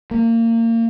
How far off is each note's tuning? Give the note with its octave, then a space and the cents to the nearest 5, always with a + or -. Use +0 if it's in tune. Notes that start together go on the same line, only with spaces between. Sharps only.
A#3 -30